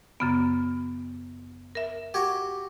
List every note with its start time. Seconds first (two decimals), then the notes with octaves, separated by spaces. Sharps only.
0.20 F#2 C#3 B3
1.75 A#4 E5
2.14 F#4 G4 G#6